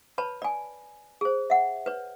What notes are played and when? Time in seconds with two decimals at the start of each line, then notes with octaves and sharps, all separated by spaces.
0.18 B4 C#5 A5 B5
0.42 D5 G#5
1.21 G#4 C5
1.50 E5 F#5
1.86 B4 C#5